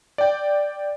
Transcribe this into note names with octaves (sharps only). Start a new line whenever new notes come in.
D5 G5